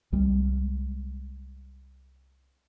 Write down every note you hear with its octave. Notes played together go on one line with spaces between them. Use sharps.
C2 G3 G#3